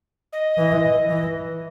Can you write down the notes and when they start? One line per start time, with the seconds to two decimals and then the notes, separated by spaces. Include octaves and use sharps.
0.33 D#5
0.58 E3
1.10 E3